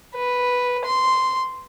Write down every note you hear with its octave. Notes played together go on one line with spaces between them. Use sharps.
B4
C6